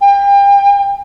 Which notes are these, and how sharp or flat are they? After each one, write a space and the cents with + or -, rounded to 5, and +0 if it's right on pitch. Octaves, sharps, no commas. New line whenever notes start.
G5 +35